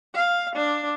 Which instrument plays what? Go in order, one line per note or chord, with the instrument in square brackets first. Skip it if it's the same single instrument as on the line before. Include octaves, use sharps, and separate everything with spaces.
[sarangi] F5
D4